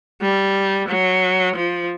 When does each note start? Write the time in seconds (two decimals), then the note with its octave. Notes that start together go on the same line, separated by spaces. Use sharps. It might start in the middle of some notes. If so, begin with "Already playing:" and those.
0.22 G3
0.88 F#3
1.56 F3